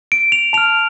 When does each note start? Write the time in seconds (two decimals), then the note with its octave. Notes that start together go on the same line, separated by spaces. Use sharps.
0.12 D7
0.32 F7
0.53 A5 F6 F7